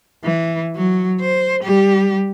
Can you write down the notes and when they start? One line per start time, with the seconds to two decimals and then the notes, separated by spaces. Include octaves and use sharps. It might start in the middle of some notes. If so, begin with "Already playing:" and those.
0.24 E3
0.76 F#3
1.20 C5
1.63 G3 G4